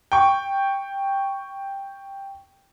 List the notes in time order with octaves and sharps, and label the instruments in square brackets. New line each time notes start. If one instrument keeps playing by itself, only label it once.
[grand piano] G5 C#6